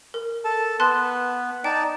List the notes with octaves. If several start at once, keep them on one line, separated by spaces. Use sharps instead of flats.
A#4
A4 A5
B3 B4 A5 C6 F#6
D#4 D5 G5 A5